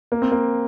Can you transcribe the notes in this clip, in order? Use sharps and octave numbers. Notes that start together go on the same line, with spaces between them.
A#3
C4
A#3